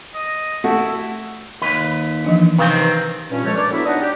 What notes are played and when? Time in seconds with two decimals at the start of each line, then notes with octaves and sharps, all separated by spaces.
0.14 D#5
0.64 A3 E4 F#4 A4
1.62 D#2 B4
2.25 E3 F3 D4
2.58 C3 D#3 C4 B4 F5
3.30 G2 A#2 C#4
3.44 F#2 D3 F3 G#3 A3 C#5
3.55 D4 A#4 B4 C#5 D5
3.71 F#3 A3 B3 D4 E4
3.85 D4 D#4 D#5 F#5
4.00 G4